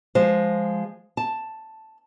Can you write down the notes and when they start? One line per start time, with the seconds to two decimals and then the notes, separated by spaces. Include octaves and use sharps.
0.15 F3 G#3 C5
1.17 A5